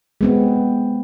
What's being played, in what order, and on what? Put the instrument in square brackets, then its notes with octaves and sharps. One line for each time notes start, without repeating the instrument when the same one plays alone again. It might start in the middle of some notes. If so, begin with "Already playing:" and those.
[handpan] G#3 B3 C4